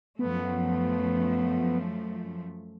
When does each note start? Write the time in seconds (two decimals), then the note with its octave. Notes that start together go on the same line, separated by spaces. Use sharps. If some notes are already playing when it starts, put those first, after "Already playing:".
0.19 F#2 F3 A3 B3